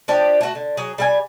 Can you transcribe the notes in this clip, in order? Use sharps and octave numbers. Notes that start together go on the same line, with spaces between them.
F3 D4 G4 D5
A3 F#4
D3
F#3 G#4
G3 E5 G#5